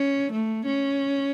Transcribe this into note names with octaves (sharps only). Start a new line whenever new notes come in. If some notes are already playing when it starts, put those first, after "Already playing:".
Already playing: C#4
A3
C#4